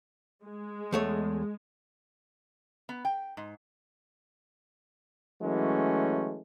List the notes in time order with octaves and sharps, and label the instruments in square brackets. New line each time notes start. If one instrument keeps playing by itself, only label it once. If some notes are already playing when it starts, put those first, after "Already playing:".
[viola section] G#3
[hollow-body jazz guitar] E2 A3 C#5
[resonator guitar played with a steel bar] B3
G5
G#2
[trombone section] E3 F#3 G#3 A3 C#4